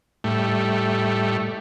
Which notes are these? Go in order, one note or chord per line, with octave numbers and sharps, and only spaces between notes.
A2 G3 A3